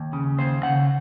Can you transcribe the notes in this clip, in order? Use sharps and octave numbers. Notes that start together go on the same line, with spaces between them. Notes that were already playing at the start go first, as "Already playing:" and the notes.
Already playing: D#2
C#3
D#2 C5
C#3 F#5